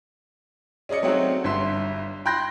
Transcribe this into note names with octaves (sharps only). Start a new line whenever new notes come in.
C#4 G#4 D5 D#5 C#7
F#3 A3 C4 C#4 D#4 F#4
G1 G2 E5 C6
G5 B5 C6 F#6 G6 A#6